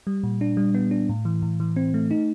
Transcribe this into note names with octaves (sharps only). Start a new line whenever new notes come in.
G3
A#2
D4
G3
B3
D4
A2
E3
A2
E3
C4
A3
D#4